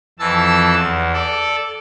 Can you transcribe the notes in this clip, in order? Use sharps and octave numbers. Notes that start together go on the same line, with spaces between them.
F2 E3 A5 E6
E2
A4 D5